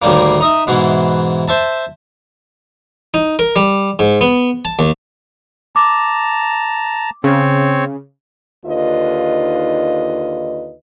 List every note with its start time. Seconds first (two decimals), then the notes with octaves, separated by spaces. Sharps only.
0.02 D2 A2 D#3 G3 A#3
0.40 D#4 D#5 E5
0.67 G#2 B2 E3
1.48 C5 E5 A5
3.14 D#4
3.39 A#4
3.56 G3
3.99 G#2
4.21 B3
4.65 A5
4.79 D#2
5.76 A5 A#5 D6
7.24 C#3 C4 C#5
8.65 D#2 D3 D#4 F4 B4 D#5